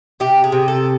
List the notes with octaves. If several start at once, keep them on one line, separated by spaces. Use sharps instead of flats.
C3 G4
G#4
C3
A4